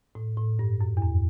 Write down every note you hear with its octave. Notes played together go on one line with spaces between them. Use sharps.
A2
A2
G2
F#2
E2
F#2